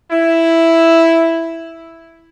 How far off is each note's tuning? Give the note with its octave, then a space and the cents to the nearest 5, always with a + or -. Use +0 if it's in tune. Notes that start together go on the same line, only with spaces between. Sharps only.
E4 +0